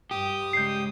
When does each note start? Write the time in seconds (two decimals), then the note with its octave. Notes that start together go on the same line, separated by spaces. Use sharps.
0.11 G2 G4 D#6
0.53 C#3 G#3 G6 C7